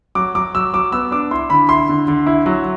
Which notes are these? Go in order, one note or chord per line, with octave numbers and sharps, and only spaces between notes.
F#3 D6
F#3 D6
F#3 E6
F#3 D6
B3 E6
D4 D6
E4 C6
D3 B5
E4 C6
D3
D3
E4
F#3